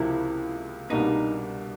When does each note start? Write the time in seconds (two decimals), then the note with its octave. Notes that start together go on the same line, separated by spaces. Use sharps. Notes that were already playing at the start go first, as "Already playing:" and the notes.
Already playing: C#2 C3 F3 A#3 E4
0.90 C2 B2 G3 A#3 D4 D#4